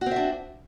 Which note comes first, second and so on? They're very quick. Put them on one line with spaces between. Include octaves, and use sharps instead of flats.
F#4 C4 E5 D4